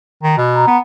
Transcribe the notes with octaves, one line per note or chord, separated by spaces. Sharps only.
D#3
B2
A#5
B3